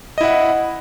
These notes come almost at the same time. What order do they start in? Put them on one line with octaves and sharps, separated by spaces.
D#5 E4 F#5